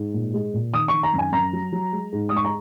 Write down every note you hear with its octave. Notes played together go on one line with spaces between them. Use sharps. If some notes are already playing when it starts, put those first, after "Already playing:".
Already playing: G#2
A#2
G#3
A#2
D#3 D#6
D#3 C#6
A#5
F#2
G#5
F#2 A#5
F#3
F#3
G#3
G#2
G#3 D#6
C#6
A#5